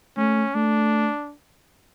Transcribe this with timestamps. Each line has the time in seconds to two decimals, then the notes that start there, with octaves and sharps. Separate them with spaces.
0.17 A3 C#4
0.55 A3 D4